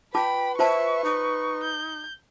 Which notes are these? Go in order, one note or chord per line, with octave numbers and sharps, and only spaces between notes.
F4 B4 G5 A5 B5 D6
F4 C5 E5 A5 C#6
D#4
G6